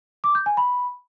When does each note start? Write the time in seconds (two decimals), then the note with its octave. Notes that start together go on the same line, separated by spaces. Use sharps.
0.24 D6
0.35 G6
0.46 G#5
0.57 B5